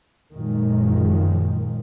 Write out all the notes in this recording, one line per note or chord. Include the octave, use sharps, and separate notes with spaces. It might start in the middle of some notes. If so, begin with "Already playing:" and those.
F#2 A#2 D#3 F3 G#3